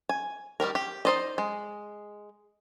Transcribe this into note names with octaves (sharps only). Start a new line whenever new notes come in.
G#5
D#3 G3 G4 A#4
G4
D#4 A4 C5 D5 D#5
G#3